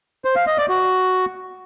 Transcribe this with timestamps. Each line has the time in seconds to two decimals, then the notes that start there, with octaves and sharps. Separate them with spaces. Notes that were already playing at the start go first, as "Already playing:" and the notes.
0.25 C5
0.36 F5
0.47 D#5
0.58 D5
0.69 F#4